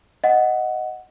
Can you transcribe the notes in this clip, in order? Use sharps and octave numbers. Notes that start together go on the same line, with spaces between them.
D#5 F#5